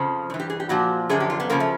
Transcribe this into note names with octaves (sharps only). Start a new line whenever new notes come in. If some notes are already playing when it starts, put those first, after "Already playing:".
Already playing: F2 C#3 F3
G2 E3
G4
G#4
G4
A#2 F3 F#4
F#2 D3 F3 G#4
G4
F4
B3
C#3 F3 A#3
A3